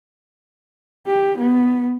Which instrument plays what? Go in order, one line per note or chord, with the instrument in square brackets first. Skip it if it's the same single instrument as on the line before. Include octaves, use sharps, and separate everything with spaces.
[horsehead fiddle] G4
B3